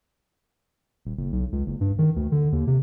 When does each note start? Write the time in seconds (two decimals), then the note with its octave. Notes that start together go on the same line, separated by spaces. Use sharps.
1.05 D#1
1.17 F#1
1.32 B1
1.52 C#2
1.66 F#1
1.81 G2
1.99 D#3
2.16 D2
2.32 D3
2.52 D#2
2.67 C3